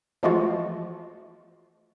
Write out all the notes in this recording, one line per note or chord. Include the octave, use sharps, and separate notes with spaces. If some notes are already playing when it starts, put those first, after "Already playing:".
E3 F3 G#3 A3 F4 F#4